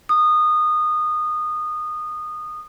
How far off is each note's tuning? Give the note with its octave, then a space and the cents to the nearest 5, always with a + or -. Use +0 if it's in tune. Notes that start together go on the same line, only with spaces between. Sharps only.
D#6 -20